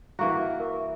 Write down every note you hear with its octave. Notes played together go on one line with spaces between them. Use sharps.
E3 A#3 F#4 A#5 C#6
A#4 E5